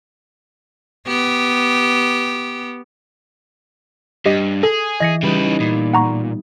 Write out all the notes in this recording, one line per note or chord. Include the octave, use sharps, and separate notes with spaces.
B3 G4
G2 G4 D#5
G#4 A4
E3 D#5 A#6 C#7
C#3 G3 D#4 B4
A#2 B3
F#5 A#5 C#6